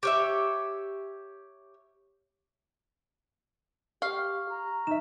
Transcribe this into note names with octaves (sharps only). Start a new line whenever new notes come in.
G4 C#5 E5
G4 F5 C#6 F6
A#5
D#4 E5 E7